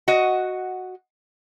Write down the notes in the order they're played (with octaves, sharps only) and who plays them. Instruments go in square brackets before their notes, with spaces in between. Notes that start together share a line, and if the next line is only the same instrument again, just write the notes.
[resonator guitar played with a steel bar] F#4 D#5